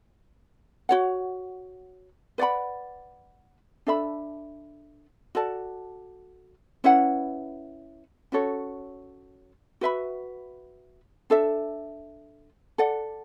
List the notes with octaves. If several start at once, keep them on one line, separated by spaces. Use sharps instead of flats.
F#4 C#5 F#5
B4 D5 F#5 B5
D4 A4 E5 B5
F#4 A4 D5 A5
C#4 E4 B4 F#5
C#4 F#4 A4 C#5
F#4 B4 E5 B5
D4 A4 E5
A4 D5 F#5